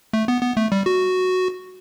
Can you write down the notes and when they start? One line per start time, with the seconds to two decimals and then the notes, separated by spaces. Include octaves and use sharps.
0.13 A3
0.28 B3
0.42 B3
0.57 A3
0.72 G3
0.86 F#4